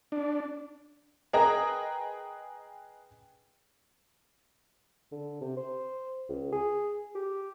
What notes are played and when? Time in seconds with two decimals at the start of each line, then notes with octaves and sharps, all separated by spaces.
0.12 D4
1.33 G#4 A#4 B4 D#5 G5 A#5
5.12 D3
5.41 C3
5.57 C5
6.29 C#2
6.53 G#4
7.15 G4